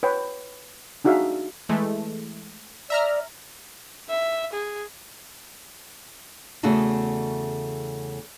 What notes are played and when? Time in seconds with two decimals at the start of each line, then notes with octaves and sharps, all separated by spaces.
0.03 B4 C#5 G5
1.04 D4 D#4 F#4 G#4 E5 F5
1.69 E3 G#3 A3
2.90 D5 E5 A#5 F6
4.09 E5
4.53 G#4
6.63 E2 C#3 A3 F#4 G#4 A4